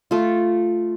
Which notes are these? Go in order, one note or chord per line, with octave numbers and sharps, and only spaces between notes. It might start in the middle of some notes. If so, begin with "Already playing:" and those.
A3 F4